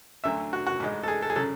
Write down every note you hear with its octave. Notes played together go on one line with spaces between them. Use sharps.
D2 D3 F#3 E5
F#4
F#4
A1 G#2 G#3
A4
G#4
A4
G#4
C#3 F#3 A4